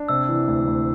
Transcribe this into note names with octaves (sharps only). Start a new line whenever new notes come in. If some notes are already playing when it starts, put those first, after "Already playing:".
Already playing: D4
C3 E6
E3
D2
D2